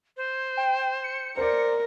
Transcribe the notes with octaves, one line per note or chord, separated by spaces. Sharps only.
C5
G5
C#7
A#4 C5 D5